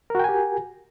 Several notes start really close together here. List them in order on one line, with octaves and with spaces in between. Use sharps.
A#4 F#4 G5 G#5 G4